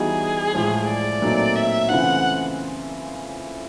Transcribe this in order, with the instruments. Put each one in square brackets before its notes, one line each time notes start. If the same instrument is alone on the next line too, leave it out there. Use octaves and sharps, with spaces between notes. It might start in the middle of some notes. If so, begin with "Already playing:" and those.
Already playing: [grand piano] E3 G3 B3 D#4 F#4 [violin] G#4
[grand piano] A2 F3 G#3
[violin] D5
[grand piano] A#2 F#3 A3 C4 D#4
[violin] E5
[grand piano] C#3 E3 A3 C4 F4 [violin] F#5